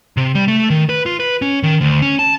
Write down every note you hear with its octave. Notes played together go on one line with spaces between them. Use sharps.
C3
G3
A3
D#3
B4
F4
B4
C#4
D#3
D2
C#4
A5